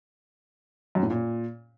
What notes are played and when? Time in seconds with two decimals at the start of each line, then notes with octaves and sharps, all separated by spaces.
0.95 F#2
1.03 A2
1.10 A#2